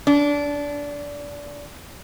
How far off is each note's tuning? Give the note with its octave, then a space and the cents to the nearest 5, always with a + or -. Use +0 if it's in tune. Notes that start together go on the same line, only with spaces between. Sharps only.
D4 -20